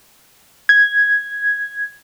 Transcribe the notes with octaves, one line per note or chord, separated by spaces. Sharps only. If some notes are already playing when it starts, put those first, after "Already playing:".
G#6